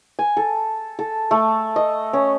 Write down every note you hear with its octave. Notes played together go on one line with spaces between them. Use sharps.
G#5
A4
A4
A3
D#5
C#4